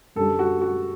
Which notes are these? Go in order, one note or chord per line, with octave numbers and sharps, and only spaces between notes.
F#2 D3 G3 A4
F#4
F#4